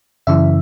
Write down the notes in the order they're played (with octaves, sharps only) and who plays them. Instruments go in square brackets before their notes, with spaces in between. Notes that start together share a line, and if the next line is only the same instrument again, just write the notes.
[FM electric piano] F#2 C#3 E3 E5